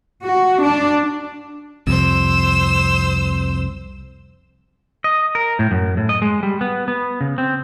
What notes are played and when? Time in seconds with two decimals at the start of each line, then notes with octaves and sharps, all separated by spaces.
0.24 F#4
0.63 D4
1.87 C2 F2 C5 E6
5.04 D#5
5.35 A#4
5.59 A2
5.71 F#2
5.97 A2
6.09 D#5
6.22 G#3
6.43 G3
6.61 B3
6.88 B3
7.21 C#3
7.38 C4